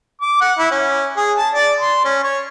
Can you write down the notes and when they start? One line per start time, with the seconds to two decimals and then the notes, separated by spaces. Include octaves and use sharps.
0.22 D6
0.41 F#5
0.59 E4
0.71 C#4
1.17 G#4
1.38 A5
1.54 D5
1.80 C6
2.05 C#4
2.23 C#5